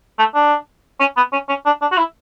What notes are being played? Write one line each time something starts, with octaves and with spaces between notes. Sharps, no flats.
A3
D4
C#4
B3
C#4
C#4
D4
D4
F#4
E4